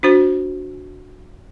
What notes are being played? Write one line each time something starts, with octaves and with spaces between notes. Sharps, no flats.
D4 F#4 C5